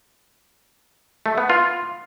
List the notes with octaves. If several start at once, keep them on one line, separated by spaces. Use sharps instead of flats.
A3
B3
F4